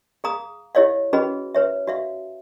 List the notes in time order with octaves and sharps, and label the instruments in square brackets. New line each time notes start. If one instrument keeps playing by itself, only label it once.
[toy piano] G#4 F5 A#5 D#6
E4 G4 C#5 D#5 F5
C#4 F#4 G#4 B4 D#5 B5
B4 C#5 E5
F#4 E5 F5